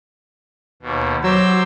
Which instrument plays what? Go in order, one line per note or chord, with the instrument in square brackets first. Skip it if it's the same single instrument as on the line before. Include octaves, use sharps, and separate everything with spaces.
[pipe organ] D#2 B2
[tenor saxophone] F#3 [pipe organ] G4 C5 E6